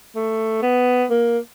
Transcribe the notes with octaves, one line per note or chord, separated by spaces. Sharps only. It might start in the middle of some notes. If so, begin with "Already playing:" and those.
A3
B3
A#3